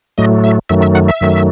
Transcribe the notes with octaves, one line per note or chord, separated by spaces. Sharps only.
A2 F#3 A3 D#5
E5
F#2 D#3 F#3 A3 E5
E5
F#5
E5
F#2 D#3 F#3 A3